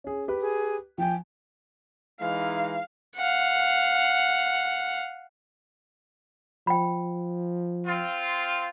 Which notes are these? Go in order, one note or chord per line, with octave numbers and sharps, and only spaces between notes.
C#4 G#4
G4 B4
G#4
F3 G5 G#5
E3 G#3 D#4 F5
F5 F#5
F3 G5 B5
C4 F4